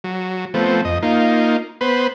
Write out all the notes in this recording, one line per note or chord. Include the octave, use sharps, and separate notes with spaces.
F#3
F3 A3 B3 C4
F2 D#5
A#3 D#4 F4
B3 B4 C5